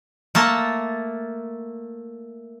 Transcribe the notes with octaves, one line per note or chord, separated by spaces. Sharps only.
A3 A#3 A5